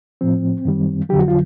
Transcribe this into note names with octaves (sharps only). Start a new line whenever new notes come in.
A2 F3 C4
F#2 D#3 G3
F2 D3 F#3 G4
F#4
F4